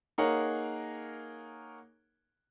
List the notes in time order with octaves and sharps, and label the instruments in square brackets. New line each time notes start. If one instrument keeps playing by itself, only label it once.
[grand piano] A#3 D#4 G#4 A#4 C#5 F#5